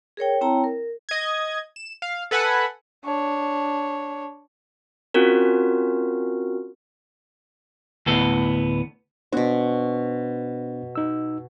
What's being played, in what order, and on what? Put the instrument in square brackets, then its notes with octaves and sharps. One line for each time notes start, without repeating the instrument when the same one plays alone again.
[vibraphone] G#4 A#4 C#5 G5
C4 E4 C#5 G5 A5 A#5
A#4
[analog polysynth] D#5 G#6
E7
F5
A4 B4 F#5 G#5 B5
[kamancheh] D4 C#5
[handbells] C4 C#4 F4 F#4 A#4
[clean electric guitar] D2 A2 B3 A4
[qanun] B2 F#4 [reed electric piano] B3 D4 C5
[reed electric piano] D#4 E6